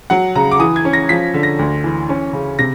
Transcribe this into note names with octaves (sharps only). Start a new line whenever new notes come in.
F#3 F#5
C#3 A#5
D6
E3 D#6
G#6
C#4
A#6
F3 B6
D3
A#6
D2
E3
C#4
C#3
C3 A#6